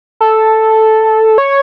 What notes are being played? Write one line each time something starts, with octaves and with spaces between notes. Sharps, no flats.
A4
C#5